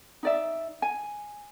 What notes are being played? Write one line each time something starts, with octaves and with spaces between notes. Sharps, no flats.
D#4 D5 E5
G#5